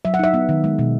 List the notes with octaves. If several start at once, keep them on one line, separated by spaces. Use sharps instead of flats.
F#3 E5
F#5
D#4 E5
B3
D#3
G#3
B2